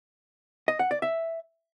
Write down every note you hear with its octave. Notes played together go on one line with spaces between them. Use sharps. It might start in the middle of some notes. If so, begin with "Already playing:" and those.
D#5
F#5
D5
E5